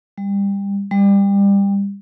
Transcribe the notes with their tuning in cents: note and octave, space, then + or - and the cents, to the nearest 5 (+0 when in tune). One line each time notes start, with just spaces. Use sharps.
G3 +25
G3 +25